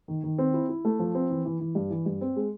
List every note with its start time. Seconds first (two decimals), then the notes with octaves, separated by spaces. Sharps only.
0.08 D#3
0.24 D#3
0.38 C4
0.54 E4
0.69 E4
0.85 A3
0.99 F3
1.15 C4
1.30 E3
1.45 E3
1.60 E3
1.75 G2
1.90 E3
2.06 G2
2.21 C4
2.36 G#3